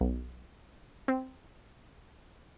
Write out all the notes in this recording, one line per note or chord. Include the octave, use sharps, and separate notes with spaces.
B1
C4